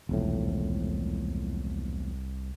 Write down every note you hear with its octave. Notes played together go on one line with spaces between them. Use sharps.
E1 C2 F2 A2